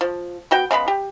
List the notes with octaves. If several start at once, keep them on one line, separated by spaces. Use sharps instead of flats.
F3
B3 F#4 G5
C#3 G#3 B3 B5
G4